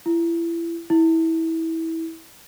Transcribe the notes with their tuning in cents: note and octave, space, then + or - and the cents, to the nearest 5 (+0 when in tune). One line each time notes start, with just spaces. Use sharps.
E4 +30
E4 -20